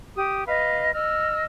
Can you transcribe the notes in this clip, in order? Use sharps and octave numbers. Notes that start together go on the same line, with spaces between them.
G4 D#6
B4 D#5 F5
D#5 E6 F6